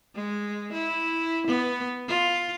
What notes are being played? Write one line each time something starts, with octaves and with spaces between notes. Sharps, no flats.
G#3
E4
B3
F4